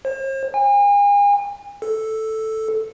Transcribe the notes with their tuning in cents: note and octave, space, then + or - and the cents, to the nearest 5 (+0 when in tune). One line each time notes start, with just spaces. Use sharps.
C5 +45
G#5 -40
A4 +0